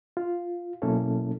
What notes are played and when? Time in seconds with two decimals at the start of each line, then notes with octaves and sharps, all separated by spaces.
0.17 F4
0.82 B2 F#3 A#3 C#4 E4 A4